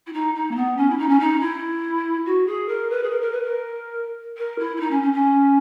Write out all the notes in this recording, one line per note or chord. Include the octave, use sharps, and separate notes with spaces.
E4
D#4
D#4
A#3
B3
C#4
E4
D#4
C#4
D#4
E4
F#4
G#4
A#4
B4
G#4
A#4
A#4
B4
A#4
A#4
E4
E4
D#4
C#4
C#4
C#4